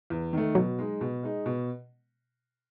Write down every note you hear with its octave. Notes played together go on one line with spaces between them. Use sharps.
E2
D#3 A3
B2 F#3
G#3 D#4
B2
G#3 D#4
B2